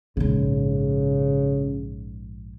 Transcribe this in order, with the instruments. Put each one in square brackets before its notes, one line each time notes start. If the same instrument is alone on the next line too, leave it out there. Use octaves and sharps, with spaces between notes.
[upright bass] A#1 G#2 [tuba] C#3